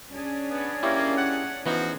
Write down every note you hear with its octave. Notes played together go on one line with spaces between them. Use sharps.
C#4 D4 G#4
B3
A#3 E4 G4 C#5
F#5
E3 F3 B3 D#4 F#4